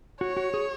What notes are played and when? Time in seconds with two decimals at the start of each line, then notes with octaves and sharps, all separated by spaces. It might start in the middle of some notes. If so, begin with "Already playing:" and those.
0.21 F#4 C#5
0.37 F#4
0.54 G#4